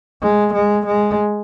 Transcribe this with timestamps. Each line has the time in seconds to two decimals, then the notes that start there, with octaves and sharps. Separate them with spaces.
0.22 G#3
0.54 G#3
0.86 G#3